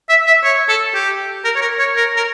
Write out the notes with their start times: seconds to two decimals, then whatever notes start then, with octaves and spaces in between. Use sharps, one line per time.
0.09 E5
0.27 E5
0.44 C#5
0.68 A4
0.94 G4
1.44 A#4
1.56 C#5
1.61 A#4
1.79 C#5
1.96 A#4
2.17 A#4